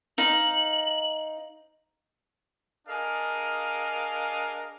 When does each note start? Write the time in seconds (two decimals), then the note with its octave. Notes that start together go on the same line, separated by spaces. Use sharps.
0.18 D#4 C5 F5 F#7
2.87 D4 G#4 A#4 D#5 F5